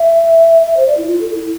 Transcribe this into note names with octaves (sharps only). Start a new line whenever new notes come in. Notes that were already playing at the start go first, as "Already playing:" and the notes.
Already playing: E5
E5
C5
D5
E4
F4
A4
E4